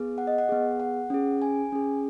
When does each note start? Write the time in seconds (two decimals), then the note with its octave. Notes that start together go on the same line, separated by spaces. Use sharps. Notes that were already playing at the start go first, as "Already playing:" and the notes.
Already playing: B3 G#4
0.18 F#5
0.27 D#5
0.38 F#5
0.49 B3 G#4
0.80 F#5
1.10 C#4 G#4
1.42 G#5
1.72 C#4 G#4